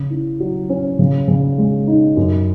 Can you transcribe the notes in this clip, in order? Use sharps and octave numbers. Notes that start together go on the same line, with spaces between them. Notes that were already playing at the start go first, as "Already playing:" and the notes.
Already playing: C#3
E4
F#3
C#4
C#3
C#3
G#3
D#4
F#2